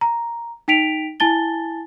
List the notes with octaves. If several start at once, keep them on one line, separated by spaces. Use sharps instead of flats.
A#5
D#4 G5 B6 D7 F7
E4 G#5 A5 A6 G7